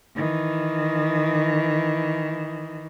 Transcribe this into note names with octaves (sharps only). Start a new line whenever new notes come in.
D#3 E3